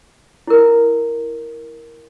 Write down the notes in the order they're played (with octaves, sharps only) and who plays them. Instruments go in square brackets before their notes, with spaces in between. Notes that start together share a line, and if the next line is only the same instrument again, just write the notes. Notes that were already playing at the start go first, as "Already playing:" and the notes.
[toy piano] E4 A#4